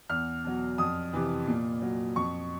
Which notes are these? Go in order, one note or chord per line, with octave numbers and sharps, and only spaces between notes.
E2 F6
B2 F#3
F2 D#6
C3 E3
A#2
F#3
F2 C#6